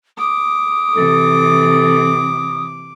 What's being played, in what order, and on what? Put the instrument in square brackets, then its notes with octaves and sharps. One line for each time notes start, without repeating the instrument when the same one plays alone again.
[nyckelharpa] D6 [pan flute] D#6
[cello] C3 E3 [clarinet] A4